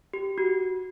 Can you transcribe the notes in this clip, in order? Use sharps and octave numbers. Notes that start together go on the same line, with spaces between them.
G4
F#4